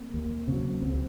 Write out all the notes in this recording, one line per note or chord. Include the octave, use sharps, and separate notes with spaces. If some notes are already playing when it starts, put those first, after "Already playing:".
Already playing: A#3 C4
D#2 A#3
C#3 F#3 C4
C#2 C4